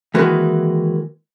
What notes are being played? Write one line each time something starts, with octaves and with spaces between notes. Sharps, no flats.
D#3 E3 G#3 A#3 F#4 B4